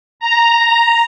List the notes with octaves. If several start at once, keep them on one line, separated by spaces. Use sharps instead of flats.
A#5